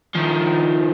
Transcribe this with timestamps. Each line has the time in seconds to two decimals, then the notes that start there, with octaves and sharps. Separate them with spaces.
0.15 D#3 F3